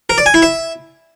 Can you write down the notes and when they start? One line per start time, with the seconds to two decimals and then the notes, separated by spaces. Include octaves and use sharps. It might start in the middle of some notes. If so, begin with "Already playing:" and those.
0.10 A#4
0.18 D5
0.26 G#5
0.34 E4
0.42 E5